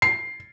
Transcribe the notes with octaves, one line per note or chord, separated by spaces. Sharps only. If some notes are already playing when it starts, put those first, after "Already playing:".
C7